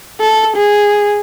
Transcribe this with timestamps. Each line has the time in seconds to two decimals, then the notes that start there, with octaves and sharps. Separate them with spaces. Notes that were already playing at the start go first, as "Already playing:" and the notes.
0.21 A4
0.56 G#4